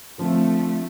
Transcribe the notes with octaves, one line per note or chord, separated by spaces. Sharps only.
D3 F3 A3 C4